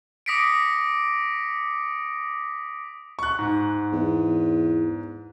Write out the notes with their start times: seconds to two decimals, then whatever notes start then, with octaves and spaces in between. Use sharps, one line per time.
0.26 D6 D#6 A#6 B6 C#7 D7
3.19 C#6 F#6
3.39 G#2
3.93 E2